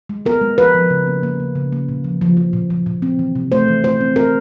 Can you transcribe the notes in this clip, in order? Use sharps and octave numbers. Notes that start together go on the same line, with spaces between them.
G#3
B3 A#4
G#3
F3 B4
F3
C#3
A#3
A#3
C#3
C#3
A#3
A#2
F3
F3
F3
A#2
F3
A#2
C4
E3
C3
A3 C5
E3
A3 C5
C4
C4 A#4